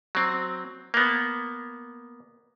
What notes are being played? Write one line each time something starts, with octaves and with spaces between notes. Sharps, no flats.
F#3 C4
A#3 B3